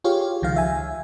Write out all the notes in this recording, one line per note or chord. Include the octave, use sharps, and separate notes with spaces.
F4 G4 G#4 C#5 F5
C#2 D#3 F3 F5
E5 G#5